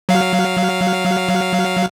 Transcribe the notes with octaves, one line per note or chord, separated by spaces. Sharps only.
F#3 F5